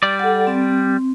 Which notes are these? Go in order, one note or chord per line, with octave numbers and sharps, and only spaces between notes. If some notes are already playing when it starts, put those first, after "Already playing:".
G3 D5
A4 F#5
C4